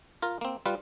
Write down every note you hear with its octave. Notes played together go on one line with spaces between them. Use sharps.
F4 A#4
A#3 C4
G3 F4 B4